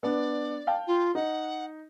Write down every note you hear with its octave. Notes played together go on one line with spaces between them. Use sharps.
B3 D4 D5
F5 G5 A5
F4
D#4 F#5